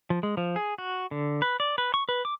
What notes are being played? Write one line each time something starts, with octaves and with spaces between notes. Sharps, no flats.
F3
G#3
F3
G#4
F#4
D3
B4
D5
B4
C#6
B4
D6